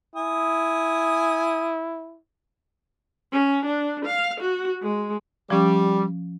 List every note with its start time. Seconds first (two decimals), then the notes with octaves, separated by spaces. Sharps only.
0.16 E4 G#5 D#6
3.33 C#4
3.65 D4
4.06 F5
4.41 F#4
4.83 G#3
5.50 F3 G3 C#4 D6